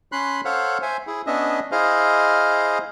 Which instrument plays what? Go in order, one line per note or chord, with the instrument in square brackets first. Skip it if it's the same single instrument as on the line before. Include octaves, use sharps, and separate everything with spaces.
[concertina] C#4 B5 C6 F#6
A4 C5 C#5 F5 F#5
C5 E5 G#5
E4 G#4
B3 C#4 D4 D#5 E5
E4 G#4 C5 D#5 F5